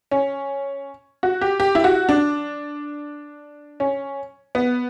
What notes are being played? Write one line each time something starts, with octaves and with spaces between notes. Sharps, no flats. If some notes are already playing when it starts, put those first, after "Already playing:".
C#4
F#4
G4
G4
E4
F#4
D4
C#4
B3